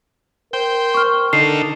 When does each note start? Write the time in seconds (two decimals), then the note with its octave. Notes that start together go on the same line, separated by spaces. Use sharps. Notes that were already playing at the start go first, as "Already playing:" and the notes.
0.53 A#4 C5 G5
0.94 C#6 F6
1.33 D3 D#4 A4 C7